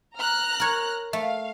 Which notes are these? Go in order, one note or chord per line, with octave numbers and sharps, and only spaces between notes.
A#5 F6 F#6
A#4 C#5
A3 F5